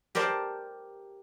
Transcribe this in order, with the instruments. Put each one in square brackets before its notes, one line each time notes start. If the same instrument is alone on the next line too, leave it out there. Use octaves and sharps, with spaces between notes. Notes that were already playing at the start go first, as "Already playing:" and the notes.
[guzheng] G4 A#4 C5 D5 A5